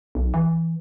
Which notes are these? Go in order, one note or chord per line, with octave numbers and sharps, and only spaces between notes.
B1
E3